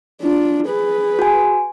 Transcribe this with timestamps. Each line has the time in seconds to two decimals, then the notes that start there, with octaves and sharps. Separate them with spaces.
0.22 D4 F4
0.67 G#4 B4
1.19 F#4 G#5